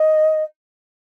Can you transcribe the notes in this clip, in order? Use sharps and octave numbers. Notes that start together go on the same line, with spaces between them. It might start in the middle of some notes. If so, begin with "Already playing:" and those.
Already playing: D#5